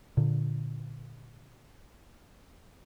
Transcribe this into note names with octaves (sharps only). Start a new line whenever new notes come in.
A#2 D3